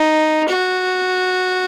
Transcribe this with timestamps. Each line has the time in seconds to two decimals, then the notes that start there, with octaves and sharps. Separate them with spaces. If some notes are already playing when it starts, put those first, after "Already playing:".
Already playing: D#4
0.49 F#4